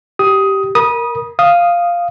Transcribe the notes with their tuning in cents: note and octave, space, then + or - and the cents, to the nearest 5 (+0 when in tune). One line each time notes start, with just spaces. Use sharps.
G4 -10 D#6 +15
A#4 +0 B5 -35 D#6 +0
F5 +0 D#6 +0